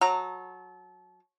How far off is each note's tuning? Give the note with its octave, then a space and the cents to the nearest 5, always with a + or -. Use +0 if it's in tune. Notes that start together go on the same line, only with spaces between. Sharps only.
F#3 -15 A4 -30 A#5 -20